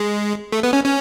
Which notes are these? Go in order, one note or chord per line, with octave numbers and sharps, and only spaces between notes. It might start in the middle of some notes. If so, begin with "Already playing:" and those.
Already playing: G#3
A3
B3
C#4
C#4